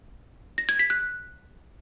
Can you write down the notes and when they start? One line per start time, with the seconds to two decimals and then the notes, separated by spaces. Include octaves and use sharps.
0.58 A#6
0.69 G#6
0.79 B6
0.90 F#6